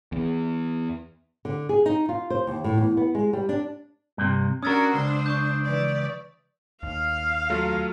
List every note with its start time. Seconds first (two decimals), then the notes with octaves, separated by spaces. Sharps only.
0.12 E2
1.45 D3
1.69 G#4
1.86 D#4
2.09 F4
2.30 C5
2.47 D#2
2.64 A2
2.78 E2
2.97 B3
3.15 G#3
3.33 G3
3.49 D4
4.18 G2 C3
4.63 C#4 D4 F#4 A#4 D#6 E6 A6
4.94 C#2 D4 C5
5.26 C#6 D#6 G6
5.64 E3 D5
6.83 D#2 F5
7.50 F#3 A3 F4